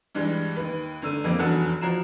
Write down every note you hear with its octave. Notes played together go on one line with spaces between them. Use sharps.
G2 E3 G3 G#3
D#2 B4
G1 D3 A3 E6 D#7
F2 G3 A#3 C4
F1 E2 G2 F#3 A4 F#5
F3 F#4 A#5 C7 E7